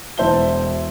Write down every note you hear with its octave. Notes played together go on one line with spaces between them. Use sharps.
E1 E4 C5 E5 A5 G7